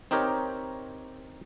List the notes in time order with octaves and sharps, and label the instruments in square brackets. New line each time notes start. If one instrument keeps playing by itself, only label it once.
[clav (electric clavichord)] C4 D#4 G4 A#4 C#5